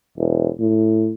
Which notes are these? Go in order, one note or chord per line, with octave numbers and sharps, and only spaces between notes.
E1
A2